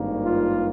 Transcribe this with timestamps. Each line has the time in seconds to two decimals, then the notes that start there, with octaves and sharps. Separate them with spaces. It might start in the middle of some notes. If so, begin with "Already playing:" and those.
Already playing: G#1 G2 D#3 A#3
0.23 F4